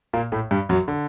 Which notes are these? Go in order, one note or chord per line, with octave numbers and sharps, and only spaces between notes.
A#2 A#3
A2 A3
G2 G3
F#2 F#3
D3